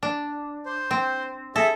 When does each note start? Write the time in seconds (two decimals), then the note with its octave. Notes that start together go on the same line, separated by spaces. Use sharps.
0.03 D4
0.66 C5
0.91 C4
1.56 G#4 A4 E5